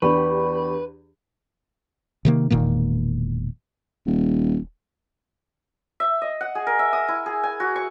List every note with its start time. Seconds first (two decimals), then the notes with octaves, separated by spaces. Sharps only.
0.02 E2 D4 G4 B4 B5 C#6
2.25 C3 D#3 A#3
2.50 E1 A#2 D#3 A#3
4.06 D#1
6.00 E5
6.22 D#5
6.41 F#5
6.55 G#4
6.67 A#4
6.79 E5
6.93 D#6
7.08 E4
7.26 G#4
7.43 G#5
7.60 F#4
7.76 C#6